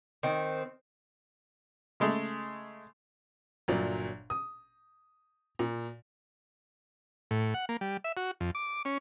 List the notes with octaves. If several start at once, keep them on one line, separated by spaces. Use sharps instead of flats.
D#3 C4
C#3 G#3 A3
G1 A#2 F#3 D5
D#6
A#2
A2
F#5
A#3
G3
E5
F#4
F2
D6
C#4